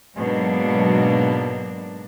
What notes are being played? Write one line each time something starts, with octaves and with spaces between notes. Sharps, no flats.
G#2 B2 F#3 A#3 D4